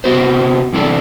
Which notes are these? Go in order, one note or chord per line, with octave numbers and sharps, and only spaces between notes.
C3 E3 B3 F#4 C5
E2 C3 E3 A3 D4